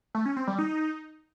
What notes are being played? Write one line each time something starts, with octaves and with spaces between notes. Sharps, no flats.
A3
C#4
C4
G3
D#4